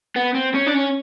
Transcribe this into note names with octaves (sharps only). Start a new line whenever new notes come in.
B3
C4
C#4
D4
C#4